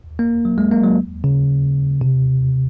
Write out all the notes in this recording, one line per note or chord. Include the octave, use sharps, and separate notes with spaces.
A#3
F#3
G#3
A#3
F#3
C#3
C3